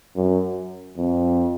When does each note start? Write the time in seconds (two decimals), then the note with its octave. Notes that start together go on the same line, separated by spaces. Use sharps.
0.16 F#2
0.97 F2